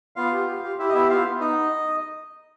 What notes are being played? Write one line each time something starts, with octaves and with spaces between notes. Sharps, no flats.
B3 F4 F5
G4
G4
G4
E4 G4 E5
D#5
B3 E4 E5
B3 F4 F5
B3
D#4 D#5